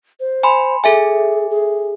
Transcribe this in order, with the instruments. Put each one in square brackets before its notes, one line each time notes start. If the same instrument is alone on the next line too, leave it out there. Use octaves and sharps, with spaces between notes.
[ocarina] C5
[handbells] G#5 B5 C6
[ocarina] G#4 [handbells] A4 E5 G#5
[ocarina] G#4